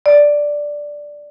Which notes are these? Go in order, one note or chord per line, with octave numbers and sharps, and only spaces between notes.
D5